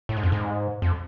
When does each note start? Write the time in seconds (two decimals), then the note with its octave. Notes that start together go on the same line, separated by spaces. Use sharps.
0.09 A2
0.17 G#2
0.23 F2
0.32 G#2
0.82 F2